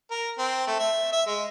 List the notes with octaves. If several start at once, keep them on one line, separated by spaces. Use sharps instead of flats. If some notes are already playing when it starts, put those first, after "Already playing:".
A#4
C4
A3
E5
E5
G#3